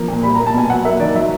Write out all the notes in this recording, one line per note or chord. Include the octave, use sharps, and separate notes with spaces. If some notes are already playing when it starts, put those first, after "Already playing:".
Already playing: F3 A#3
A#2
G3 B5
A#5
A#3
A5
B2 G#5
F#3 F#5
A#3 E5
D#3 D5
F#3 E5